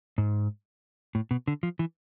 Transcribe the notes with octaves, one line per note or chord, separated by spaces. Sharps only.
G#2
A2
B2
D3
F3
E3